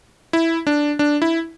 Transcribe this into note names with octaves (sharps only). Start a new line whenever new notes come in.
E4
D4
D4
E4